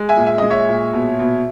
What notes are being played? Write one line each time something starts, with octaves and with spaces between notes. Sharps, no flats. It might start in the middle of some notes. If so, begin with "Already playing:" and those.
Already playing: G#3
E5 G#5
A#2
E5
G#3 D#5
C#5 E5
A#2
B2
B2